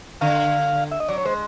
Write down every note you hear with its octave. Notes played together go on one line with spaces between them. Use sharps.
D3 F5
E5
D#5
F#3 D5
C#5
G#3 C5